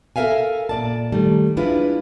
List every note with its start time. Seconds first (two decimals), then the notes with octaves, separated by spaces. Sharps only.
0.16 A4 A#4 C5 E5 F5 G#5
0.69 A#2 D5 A5
1.12 D#3 G3 A3
1.57 F3 G#3 D4 E4 F4 B4